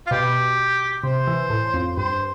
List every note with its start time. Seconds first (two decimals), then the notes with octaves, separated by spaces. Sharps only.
0.07 F4
0.11 B2 G4
1.04 C3 C5
1.27 E3
1.50 A2
1.74 F2
1.97 G2 C5